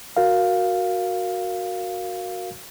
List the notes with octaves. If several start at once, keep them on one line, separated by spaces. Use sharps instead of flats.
F#4 A#4 F5